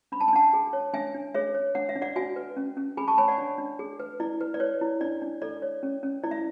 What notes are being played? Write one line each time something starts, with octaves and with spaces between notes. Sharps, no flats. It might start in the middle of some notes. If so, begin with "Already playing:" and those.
D4 B5
A5
G#5
D4 F#5 A5
G#4
C#5
D4 E5 G#5
D4
G#4 C#5 E5
C#5
D4 F#5
E5
D4
D5 F#5
F#4 E5 G#5
B4
C#4
C#4
G#4 G#5 B5
A5 C#6
C#5 G#5 B5
D5 F#5
D4
D4
G#4
B4
E4 D5
B4
D5
B4 C#5
E4
D4 D5
D4
A4 D5
C#5
C#4
C#4
E4 D5
E5